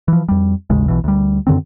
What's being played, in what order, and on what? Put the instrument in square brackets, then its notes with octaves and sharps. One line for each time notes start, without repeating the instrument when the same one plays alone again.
[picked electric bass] E3 F3
F2 G3
A1 D#2 C#3 G#3
B1 B2 E3
D2 G3
F#2 D3 D#3 C4